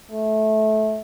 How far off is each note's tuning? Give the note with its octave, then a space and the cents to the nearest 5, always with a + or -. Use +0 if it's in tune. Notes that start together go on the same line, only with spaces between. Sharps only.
A3 -20